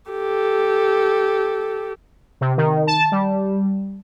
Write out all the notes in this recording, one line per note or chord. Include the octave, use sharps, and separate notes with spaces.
G4 A4
C3
D#3
A5
G3